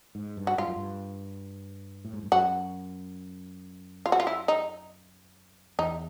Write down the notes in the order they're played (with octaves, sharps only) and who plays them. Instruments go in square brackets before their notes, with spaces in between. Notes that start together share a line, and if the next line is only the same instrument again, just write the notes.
[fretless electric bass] G#2
G2
[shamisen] F#4
[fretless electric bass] G2 [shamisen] F4
[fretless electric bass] F#2
G2
A2
G#2
G2
[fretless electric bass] F#2 [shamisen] F#4
[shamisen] F4
F#4
F4
E4
D#4
[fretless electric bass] E2 [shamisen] D#4